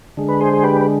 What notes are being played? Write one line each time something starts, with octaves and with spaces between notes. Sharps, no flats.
D3 G#3
B4
G#4 C5
G#4
G4 B4
B4